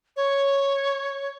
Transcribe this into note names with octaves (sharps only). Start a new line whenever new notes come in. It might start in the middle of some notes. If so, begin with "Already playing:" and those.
C#5